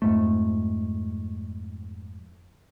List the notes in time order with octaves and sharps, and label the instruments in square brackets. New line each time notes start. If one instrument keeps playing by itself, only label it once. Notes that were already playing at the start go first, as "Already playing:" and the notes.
[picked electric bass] F2 G#2 A3